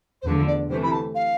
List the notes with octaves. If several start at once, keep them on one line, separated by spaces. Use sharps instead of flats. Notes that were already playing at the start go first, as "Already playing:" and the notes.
C5
E2 D3 F3 A3 B4
D5
C3 E3 A3 C5
B5
A5
F5